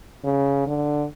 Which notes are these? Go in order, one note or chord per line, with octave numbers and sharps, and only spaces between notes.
C#3
D3